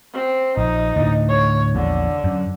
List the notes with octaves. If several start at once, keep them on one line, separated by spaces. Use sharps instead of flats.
C4
A#1 D#4
D2 A2
C#5
A#1 E2 D3
F#2